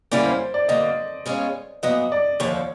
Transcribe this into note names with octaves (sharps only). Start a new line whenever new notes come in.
D3 G3 A#3 C#4 E4 D5
C5
D5
D3 F#3 A#3 D#5
B2 G#3 C#4 F4
A#2 F#3 B3 D#5
D5
D#2 D3 F3 C#5